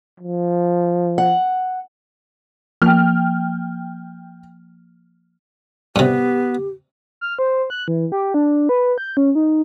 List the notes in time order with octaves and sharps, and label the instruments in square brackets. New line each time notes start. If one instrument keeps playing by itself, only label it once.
[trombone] F3
[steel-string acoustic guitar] F#5
[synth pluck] F3 A#3 [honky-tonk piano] G5 F6
[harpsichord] G2 C3 [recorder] B3 [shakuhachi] G4
[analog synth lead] F6
C5
F#6
E3
G4
D4
B4
G6
C#4
D#4